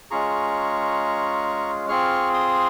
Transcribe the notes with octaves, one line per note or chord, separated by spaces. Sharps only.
G#3 C#4 F4 G#4 A#5 C#6
C4 F4 G#4 C#6 F6
C6 D#6